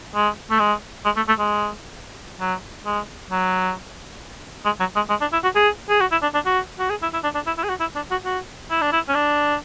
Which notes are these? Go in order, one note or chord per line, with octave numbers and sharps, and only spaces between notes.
G#3
A3
G#3
G#3
A3
A3
G#3
F#3
G#3
F#3
G#3
F#3
G#3
G#3
D4
E4
F#4
G#4
G#4
F#4
E4
D4
D4
F#4
F#4
G#4
E4
E4
D4
D4
E4
E4
G#4
F#4
E4
D4
F#4
F#4
E4
D4
E4
C#4
D4